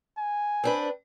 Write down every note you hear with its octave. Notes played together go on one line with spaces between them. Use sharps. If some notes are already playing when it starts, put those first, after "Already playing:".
G#5
C4 D4 B4